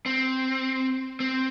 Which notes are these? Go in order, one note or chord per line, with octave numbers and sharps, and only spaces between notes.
C4
C4